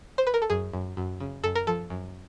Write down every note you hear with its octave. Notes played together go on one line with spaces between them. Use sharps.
C5
B4
A#4
A4
F#2 G#4
F#2
F#2
C#3
F#2 A4
A#4
F3 A4
F#2